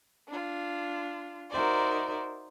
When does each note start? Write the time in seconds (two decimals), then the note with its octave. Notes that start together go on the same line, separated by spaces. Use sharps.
0.28 D4 F4
1.51 D#4 F#4 A#4 C5 D5 E5